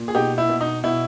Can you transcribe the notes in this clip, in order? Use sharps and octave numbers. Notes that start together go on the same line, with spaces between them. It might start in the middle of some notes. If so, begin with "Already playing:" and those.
Already playing: A#2
G#4
B2 D#4 G4
E4
B2
D#4
B2 E4